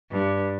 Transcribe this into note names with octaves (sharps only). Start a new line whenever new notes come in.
G2